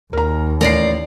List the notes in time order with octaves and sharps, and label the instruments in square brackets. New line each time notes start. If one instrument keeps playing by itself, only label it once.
[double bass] D#2 [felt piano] A#4 A#5
[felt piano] A1 C7 [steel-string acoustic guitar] A#4 D5 F5